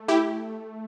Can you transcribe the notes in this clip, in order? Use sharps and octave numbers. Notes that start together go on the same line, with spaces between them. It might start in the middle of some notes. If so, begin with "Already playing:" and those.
Already playing: A3
E4 G4